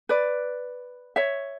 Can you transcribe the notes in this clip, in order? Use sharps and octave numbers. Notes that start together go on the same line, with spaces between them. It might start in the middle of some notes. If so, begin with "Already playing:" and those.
B4 D5
C#5 E5